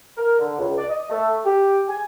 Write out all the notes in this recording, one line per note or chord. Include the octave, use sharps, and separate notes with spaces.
A#4
D3
C#2
D5
D#5
A3
G4
G#5